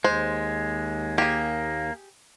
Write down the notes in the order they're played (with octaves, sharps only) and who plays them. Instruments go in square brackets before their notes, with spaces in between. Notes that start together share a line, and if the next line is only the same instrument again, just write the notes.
[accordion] D#2 [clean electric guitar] G#3 [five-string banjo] C5
[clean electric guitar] A#3 [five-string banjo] G4 G#4